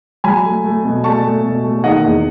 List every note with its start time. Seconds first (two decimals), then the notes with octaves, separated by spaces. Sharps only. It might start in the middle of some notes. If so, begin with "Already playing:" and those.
0.24 F#3 G#5 B5
0.44 A3
0.64 A3
0.84 B2
1.04 A3 A5 C#6
1.23 A3
1.44 B2
1.64 A3
1.84 D#3 D#5 F#5
2.04 E2